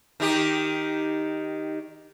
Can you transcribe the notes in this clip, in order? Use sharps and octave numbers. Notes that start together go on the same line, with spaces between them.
D#3 D#4 G4